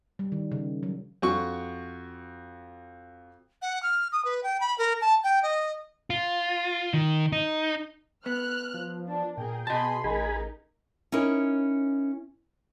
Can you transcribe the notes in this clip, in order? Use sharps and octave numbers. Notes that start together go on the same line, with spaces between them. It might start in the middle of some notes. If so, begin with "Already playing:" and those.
G3
D#3
C#3
F#3
F2 F#4 C#6
F#5
F6
D#6
B4
G5
B5
A#4
A5
G5
D#5
F4
D#3
D#4
B3 F6 F#6
F3
D4
A#2 G#4 A#4 G5
B2 G#4 D#5 A5 B5 C6
A1 D#4 G#4 A#4 G#5 B5
C#4 D#4 E4 A#4